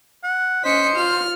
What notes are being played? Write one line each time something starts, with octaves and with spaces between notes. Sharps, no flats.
F#5
C#4 C5 D#5 B6 C#7
F4 F6